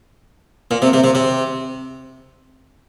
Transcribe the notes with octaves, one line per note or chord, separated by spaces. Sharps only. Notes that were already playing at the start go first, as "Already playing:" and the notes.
A#2
C3
C3
C3
C3